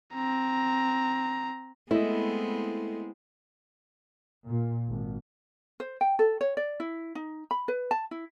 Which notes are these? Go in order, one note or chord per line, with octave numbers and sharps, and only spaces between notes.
C4 A#5
G#3 A3 B3 C4 E4 D#5
A#2
G#1
C5
G5
A4
C#5
D5
E4
D#4
B5
B4
A5
E4